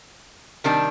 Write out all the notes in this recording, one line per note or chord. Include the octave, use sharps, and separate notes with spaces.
C3 D#3 G3 D4